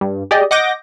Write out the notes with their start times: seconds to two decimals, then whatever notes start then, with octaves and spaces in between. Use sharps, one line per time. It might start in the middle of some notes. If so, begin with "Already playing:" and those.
0.01 G2
0.31 G4 G#4 D5 D#5
0.51 D#5 F#5 D6 G6 A#6